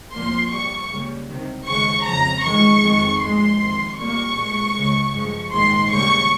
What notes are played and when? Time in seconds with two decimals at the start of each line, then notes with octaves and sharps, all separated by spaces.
0.13 C2 A#2 F3 A#3 C6
0.52 G1 G2 G3 C#6
0.90 C#2 C#3 G3 A#3
1.29 C2 C3 D#3
1.67 D#2 C#3 G#3 C#6
2.06 F2 C#3 F3 A#5
2.44 F2 D#3 G#3 C#6
2.83 F2 D#3 G#3
3.21 A#1 A#2 F3 G#3 C6
3.60 F2 C3 D#3
3.98 C2 A#2 G3 A#3 C#6
4.37 C2 A#2 G#3
4.75 C#2 C#3 G#3
5.14 G2 F3 G#3
5.52 A#1 G#2 D#3 G#3 C6
5.90 D#2 C#3 G3 A#3 C#6